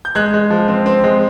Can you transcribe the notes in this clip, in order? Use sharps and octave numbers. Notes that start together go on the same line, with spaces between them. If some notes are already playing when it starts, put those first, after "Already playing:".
G6
G#3 F#6 G#6
G#3
F3
C4
C4
G#3